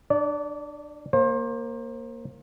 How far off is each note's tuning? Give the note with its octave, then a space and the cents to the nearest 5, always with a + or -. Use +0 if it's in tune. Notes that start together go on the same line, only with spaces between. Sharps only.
D4 +25 D5 -25
A#3 +0 C5 +30